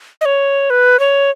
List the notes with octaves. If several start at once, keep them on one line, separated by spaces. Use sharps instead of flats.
D#5
C#5
B4
C#5